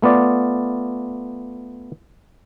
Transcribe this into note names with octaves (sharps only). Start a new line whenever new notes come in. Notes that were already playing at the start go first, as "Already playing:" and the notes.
A3 B3 F4 D5